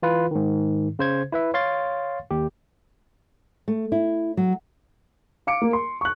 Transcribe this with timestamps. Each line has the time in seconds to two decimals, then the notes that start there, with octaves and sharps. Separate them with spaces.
0.03 E3 F4 B4
0.31 G#2 D#3
0.99 C#3 C5 G#6
1.32 E4 B4 E5
1.54 C#5 F5 C6 A6
2.31 D#2 G4
3.68 A3
3.92 E4
4.37 F#3
5.47 F5 D6 C#7 D7
5.62 A#3
5.73 C6
6.01 C#6 F#6